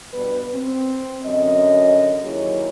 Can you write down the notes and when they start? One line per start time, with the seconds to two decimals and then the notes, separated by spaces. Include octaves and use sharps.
0.14 G2 B2 G3 B3 B4
0.54 C4
1.24 F#2 D3 C#4 D#5
2.22 D#2 F#3 A#3 E4 G#4 C#5